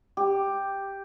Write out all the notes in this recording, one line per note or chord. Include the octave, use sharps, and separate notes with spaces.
G4